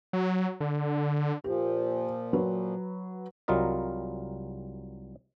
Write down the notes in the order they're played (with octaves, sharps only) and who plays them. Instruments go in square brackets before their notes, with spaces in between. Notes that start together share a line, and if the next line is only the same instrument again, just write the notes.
[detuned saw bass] F#3
D3
[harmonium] A#2 F3 [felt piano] G4
[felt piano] F#3 B4
[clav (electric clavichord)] C2 F#3 G3 F4 A#4 D#5